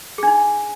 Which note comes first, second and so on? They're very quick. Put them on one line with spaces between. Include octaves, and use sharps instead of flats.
G#4 D4 D#4